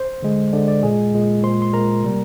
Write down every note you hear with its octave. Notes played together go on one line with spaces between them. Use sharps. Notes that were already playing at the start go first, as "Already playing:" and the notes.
Already playing: C5
D3 G#3
D3 G#3 D5
D5
A#2 G#3 G#4 G#5
A#2 G#3
A#2 G#3 C5 C6
C6
A#2 G#3 A#4 A#5
C3 G3 A#3